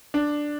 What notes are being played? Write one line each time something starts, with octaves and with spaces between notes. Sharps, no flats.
D4